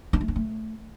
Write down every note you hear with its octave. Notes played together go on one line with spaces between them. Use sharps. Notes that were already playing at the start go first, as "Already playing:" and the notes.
D4
A3
D4
A3